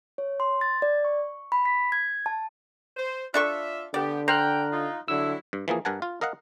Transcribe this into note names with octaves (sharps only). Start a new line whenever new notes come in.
C#5
C6
A6
D5
C#6
B5
B6
G#6
A5
C5
D4 F4 A4 D5 E5 C#6
D3 B3 G4 D5
C5 G5 A#5 F6 F#6
D#4 F4
D3 F#3 G3 E4 E6
G2
E3 F3 A#3 G#4
G2 A#4 F#5 G#5 A5
F4
A#4 D#5 F5 F#5